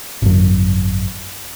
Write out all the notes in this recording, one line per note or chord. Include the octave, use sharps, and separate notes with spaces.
G#1 F#2